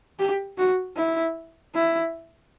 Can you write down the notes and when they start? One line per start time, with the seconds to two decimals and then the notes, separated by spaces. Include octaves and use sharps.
0.19 G4
0.58 F#4
0.97 E4
1.75 E4